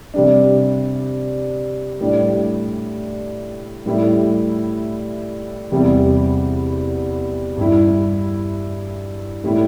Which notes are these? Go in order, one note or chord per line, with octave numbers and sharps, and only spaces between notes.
C3 G3 D4
A2 G3 D4
A2 G3 E4
E2 C3 G3
G2 G3 E4
A2 G3 E4